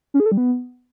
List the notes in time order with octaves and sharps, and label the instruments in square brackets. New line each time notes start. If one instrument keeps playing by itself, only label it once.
[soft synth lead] C#4
G#4
A4
G3
B3